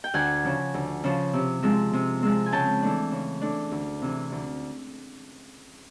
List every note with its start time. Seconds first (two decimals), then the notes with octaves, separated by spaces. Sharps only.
0.04 G5
0.14 D2 F#5 G#5
0.44 C#3 F3
0.74 D2
1.04 C#3 F3
1.33 C3
1.63 F3 G#3 C4
1.93 C3
2.23 F3 G#3 C4
2.46 G#5
2.52 C#3 G5 A5
2.82 E3 A3 D4
3.11 C#3
3.41 E3 A3 D4
3.72 D2
4.02 C3 E3
4.32 D2